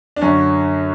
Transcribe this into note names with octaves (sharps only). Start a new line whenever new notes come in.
D4
F#2 D3 C#4